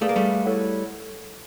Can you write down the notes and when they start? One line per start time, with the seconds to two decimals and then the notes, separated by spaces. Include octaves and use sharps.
0.02 A3 G#4 B4 D5 F5
0.09 A#3
0.16 G3 A3
0.46 E4 A4 C#5 F#5